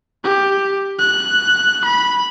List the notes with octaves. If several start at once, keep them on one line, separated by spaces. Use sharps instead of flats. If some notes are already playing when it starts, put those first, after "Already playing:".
G4
F#6
B5